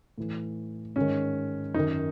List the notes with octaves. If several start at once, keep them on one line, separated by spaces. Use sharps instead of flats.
A2 E3
G#2 D#3 C#4
F#2 D#3 D#4